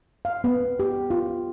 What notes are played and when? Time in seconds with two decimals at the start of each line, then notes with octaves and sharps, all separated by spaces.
0.25 F5
0.44 B3
0.80 G4
1.10 F4